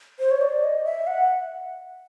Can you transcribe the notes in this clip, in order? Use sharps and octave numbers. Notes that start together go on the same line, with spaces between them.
C5
C#5
D5
D#5
E5
F#5